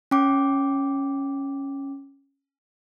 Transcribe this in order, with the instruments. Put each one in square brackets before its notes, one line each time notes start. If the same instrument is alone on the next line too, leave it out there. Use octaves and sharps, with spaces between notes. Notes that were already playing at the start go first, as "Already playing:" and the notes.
[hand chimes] C#4 G5 D6